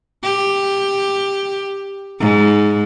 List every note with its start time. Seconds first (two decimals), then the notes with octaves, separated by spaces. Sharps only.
0.23 G4
2.20 G#2